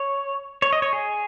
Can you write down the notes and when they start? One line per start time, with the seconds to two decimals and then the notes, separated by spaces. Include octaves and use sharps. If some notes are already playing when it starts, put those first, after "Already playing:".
Already playing: C#5
0.62 C#5
0.73 D#5
0.82 C#5
0.93 G#4